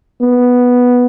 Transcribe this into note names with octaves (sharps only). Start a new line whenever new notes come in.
B3